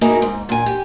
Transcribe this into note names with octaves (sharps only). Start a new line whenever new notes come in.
A#3 D#4 E4 F#4 G#4 A#4
G#2
A#2 G#5
G4